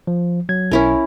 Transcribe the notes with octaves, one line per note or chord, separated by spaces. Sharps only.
F3
F#3 G#6
B1 C#4 E4 A#4